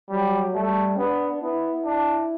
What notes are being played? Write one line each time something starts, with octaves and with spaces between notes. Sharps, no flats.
F#3 G3
G3 A3
B3 D4
B3 E4
D4